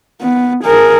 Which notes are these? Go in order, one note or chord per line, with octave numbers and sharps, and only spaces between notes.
B3
G#4 A#4